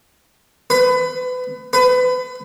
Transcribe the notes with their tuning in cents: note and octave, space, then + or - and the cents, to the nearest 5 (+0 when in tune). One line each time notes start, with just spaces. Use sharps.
B4 +30
B4 +30